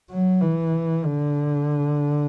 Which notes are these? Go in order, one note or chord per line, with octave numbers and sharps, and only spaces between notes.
F#3
E3
D3